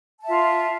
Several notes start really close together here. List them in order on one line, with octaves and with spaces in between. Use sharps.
A5 E5 F4